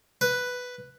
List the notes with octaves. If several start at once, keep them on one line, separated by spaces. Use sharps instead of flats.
B4